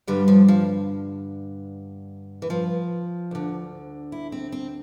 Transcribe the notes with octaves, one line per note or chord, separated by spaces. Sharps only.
G2 D3 G3
F3
F3
E3
F3
D2 D3
E4
C4
C4